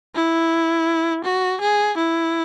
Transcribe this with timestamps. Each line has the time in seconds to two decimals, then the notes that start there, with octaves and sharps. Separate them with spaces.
0.15 E4
1.25 F#4
1.61 G#4
1.98 E4